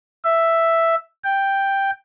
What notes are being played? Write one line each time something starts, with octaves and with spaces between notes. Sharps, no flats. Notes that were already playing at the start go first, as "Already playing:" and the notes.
E5
G5